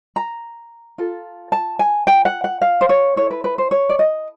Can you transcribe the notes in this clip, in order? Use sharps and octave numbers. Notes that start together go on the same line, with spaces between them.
A#5
F4 A4
A5
G#5
G5
F#5
F#5
F5
C5
C#5
E4 A4 C#5
B4
B4
C5
C#5
D5
D#5